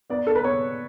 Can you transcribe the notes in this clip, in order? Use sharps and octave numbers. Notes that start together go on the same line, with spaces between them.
B3 D5
A4
B4
B3 C#5